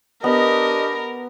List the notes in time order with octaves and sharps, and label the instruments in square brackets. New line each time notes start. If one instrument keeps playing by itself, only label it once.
[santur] B3 [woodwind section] D4 G4 D#5 [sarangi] A#4